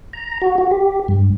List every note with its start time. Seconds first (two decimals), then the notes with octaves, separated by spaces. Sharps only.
0.13 A#5
0.42 F#4
0.58 F#4
0.71 G4
1.08 G2